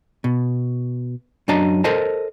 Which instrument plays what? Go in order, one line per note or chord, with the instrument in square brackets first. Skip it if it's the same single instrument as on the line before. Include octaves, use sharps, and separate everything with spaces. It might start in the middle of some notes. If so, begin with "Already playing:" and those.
[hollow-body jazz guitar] B2
F#2 F#3 D4 D#5 A5 A#5
A4 A#4 C5 D#5 A5